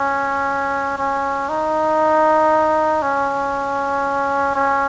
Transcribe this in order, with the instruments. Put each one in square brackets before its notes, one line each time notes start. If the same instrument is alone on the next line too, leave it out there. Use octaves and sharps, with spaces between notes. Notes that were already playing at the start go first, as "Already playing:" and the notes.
Already playing: [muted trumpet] C#4
C#4
D#4
C#4
C#4